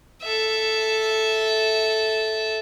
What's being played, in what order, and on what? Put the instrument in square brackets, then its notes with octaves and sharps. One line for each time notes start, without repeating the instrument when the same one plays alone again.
[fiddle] A4 E5